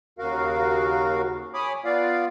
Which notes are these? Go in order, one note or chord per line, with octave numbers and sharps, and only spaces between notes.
D#2 C#3 F#4 A#4 F5
C#5 G#5 B5 D6 D#6
B3 F4 D5 F5